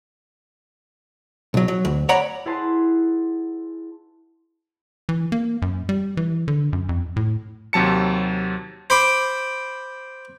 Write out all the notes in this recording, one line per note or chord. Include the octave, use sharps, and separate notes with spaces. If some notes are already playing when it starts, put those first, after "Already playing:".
B1 F#3
F#3
D2
C#5 D5 F#5 A#5 B5
E4 G#4 B4 F#5 A5 C6
E3
A#3
F#2
G3
E3
D3
F#2
F2
A2
D#2 C3 F#3 A5 C#7
C5 B5 D6